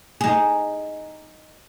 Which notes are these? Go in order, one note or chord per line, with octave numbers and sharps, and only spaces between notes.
D#4 G#4